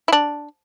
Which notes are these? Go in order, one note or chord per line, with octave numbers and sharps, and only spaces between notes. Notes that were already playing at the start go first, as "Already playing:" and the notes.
E4
D4